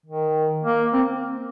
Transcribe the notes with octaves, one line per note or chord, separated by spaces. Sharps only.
D#3
A#3
C4